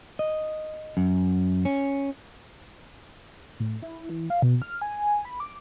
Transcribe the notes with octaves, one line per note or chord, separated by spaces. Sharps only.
D#5
F#2
C#4
A2
E4
E3
F5
B2
F6
G#5
B5
D6